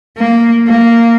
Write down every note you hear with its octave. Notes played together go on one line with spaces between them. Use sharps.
A#3
A#3